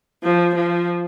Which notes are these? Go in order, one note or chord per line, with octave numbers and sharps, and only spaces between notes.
F3
F3